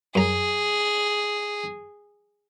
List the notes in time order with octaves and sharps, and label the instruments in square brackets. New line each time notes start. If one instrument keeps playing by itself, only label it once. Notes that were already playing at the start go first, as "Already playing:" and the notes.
[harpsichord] F#2 A#5 [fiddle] G#4